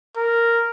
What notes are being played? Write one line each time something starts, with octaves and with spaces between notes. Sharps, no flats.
A#4